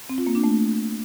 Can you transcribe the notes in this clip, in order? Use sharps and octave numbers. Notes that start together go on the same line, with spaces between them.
C4
F4
A#3
D4
A3